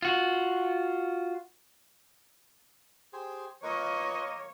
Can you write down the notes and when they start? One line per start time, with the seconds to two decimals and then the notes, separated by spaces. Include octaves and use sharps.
0.02 F4 F#4
3.13 G4 G#4 C5
3.63 A#3 F4 B4 C#5 D#5 C#6